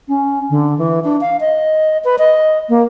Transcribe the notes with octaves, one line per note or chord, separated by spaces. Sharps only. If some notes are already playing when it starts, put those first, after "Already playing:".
C#4
D3
E3
D4
F5
D#5
B4
D#5
A#3